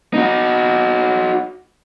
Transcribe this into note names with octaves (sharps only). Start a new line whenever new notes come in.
D#4 F#4